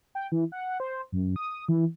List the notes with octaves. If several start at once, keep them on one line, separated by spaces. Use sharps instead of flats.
G5
E3
F#5
C5
F#2
D#6
E3